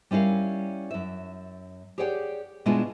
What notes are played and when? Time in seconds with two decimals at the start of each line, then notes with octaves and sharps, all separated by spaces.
0.11 G3 C#4 E4 A#4 F5
0.91 F#2 E5
1.98 G4 G#4 C#5 D5 F#5 G5
2.66 B2 G#3 D4 E4 F4 G#4